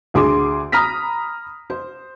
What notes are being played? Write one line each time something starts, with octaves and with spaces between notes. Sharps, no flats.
D2 G#4 C6 D6
A#5 B5 D#6 F6 A#6 B6
C5